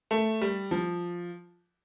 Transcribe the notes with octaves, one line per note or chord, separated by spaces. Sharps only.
A3
G3
F3